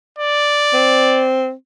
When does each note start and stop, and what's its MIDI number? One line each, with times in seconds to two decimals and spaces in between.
0.19 1.29 74
0.73 1.53 60